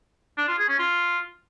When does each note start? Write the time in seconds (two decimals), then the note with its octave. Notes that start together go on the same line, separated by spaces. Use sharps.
0.38 D4
0.48 F4
0.58 G#4
0.69 C#4
0.79 F4